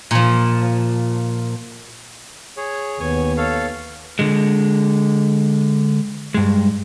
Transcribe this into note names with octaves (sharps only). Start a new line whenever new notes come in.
A#2 F3
G#4 C#5
D#2 B3 C#5 G#5
A4 C#5 F5
D3 G#3
G2 G#3